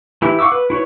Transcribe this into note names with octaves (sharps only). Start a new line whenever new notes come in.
E3 E4 G4 E5
F5 F#5 C#6 D6 E6
B4
E4 F#4 B4 C#5